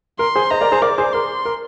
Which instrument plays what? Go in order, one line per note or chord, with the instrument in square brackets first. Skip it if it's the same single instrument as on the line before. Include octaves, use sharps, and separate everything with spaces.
[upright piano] A#4 [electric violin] C6
[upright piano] G#4 C5
[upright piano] C5 D#5 [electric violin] A#5
[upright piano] A#4 D5
G#4 C5
[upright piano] A#4 D5 [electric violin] D6
[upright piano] G#4 C5
[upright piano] A#4 [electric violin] C6
[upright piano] A#4